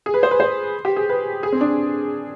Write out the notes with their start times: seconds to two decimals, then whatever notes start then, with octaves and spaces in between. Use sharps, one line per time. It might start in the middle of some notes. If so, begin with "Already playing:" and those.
0.06 G#4
0.14 B4
0.23 C5
0.31 B4
0.40 C5
0.85 G4
0.96 G#4
1.09 B4
1.43 G#4
1.52 C4
1.61 D4